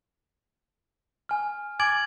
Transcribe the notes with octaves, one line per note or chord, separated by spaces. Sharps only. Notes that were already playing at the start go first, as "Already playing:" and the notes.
G#5 F6
G#5 D6 G#6 A6 D7 F#7